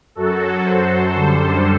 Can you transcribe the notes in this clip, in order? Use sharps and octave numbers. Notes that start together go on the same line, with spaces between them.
F#2 F#3 F#4 A4
A4 C5
F#2 D3 G3 A4 C5